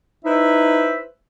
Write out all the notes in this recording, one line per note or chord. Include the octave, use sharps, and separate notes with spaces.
D#4 E4 B4 C5 E5